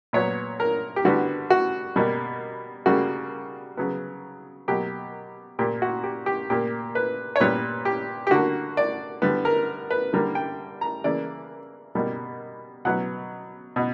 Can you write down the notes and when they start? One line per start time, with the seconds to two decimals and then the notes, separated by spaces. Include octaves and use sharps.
0.13 A#2 F#3 B3 C#5
0.60 A#4
0.96 G4
1.05 D3 G3 B3 F#4
1.50 F#4
1.96 B2 G3 A#3
2.86 C#3 G3 A#3 F#4
3.77 C#3 F#3 B3
4.68 B2 F#3 A#3 G4
5.59 A#2 A#3 G4
5.82 F#4
6.04 G4
6.26 G4
6.50 A#2 A#3 G4
6.95 B4
7.36 C#5
7.40 A#2 G3 B3 B4
7.85 G4
8.27 G4
8.31 D3 A#3 F#4
8.77 D5
9.22 D3 G3 B3
9.45 A#4
9.91 B4
10.13 D3 G3 A#3 A#4
10.35 G5
10.81 A#5
11.04 C#3 E3 A#3 D5
11.95 B2 G3 A#3
12.85 B2 F#3 B3 F#5
13.76 B2